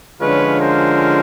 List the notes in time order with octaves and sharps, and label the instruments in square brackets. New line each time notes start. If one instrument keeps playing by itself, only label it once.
[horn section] D3 F3 G#3 C#4 F4 B4 C#5
A#4 C5